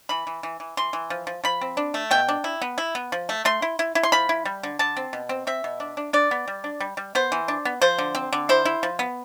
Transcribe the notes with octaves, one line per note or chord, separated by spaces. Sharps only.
E3 B5
E3
E3
E3
E3 C6
E3
F3
F3
F3 B5
C4
D4
A3
B2 G5
D4
E4
B3
E4
B3
F3
A3
A3 C6
E4
E4
E4
C6
F3 B5
E4
G3
D3
D3 A5
C4
B2
C4
C4 E5
B2
D4
D4
D4 D5
B3
G3
D4
G3
G3
B3 C5
E3
D4
B3
F3 C5
D3
C4
D3
E4 C5
E4
F3
B3